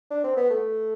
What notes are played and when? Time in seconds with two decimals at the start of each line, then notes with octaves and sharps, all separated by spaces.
0.11 D4
0.24 C4
0.37 B3
0.50 A3